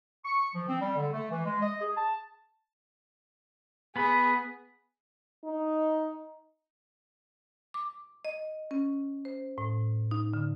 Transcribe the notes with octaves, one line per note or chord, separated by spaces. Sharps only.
C#6
F3
C4
G3
D3
A3
E3
G#3
D#5
G#4
A5
B3 G#4 B5
D#4
D6
D#5
C#4
C5
A2
D#4
D3